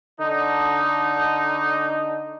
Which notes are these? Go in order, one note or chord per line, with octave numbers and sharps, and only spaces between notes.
D3 D#4